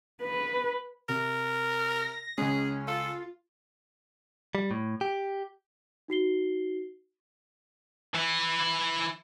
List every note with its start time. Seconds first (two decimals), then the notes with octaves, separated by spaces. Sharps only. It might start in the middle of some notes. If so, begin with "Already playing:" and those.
0.23 B4
1.09 C3 A#4
1.92 A#6
2.38 C#2 G#3 C#4 G#4
2.88 F4 A4
4.55 G3
4.71 A2
5.01 G4
6.08 D#4 F#4 C7 G7
8.14 E3 E4